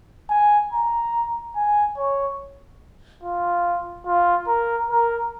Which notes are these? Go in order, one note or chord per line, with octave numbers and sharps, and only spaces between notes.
G#5
A#5
G#5
C#5
F4
F4
A#4
A#4